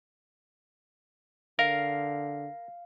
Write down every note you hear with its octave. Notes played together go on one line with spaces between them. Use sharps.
D3 A#4 F5